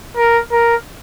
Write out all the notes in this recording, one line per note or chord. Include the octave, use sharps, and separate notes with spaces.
A#4
A#4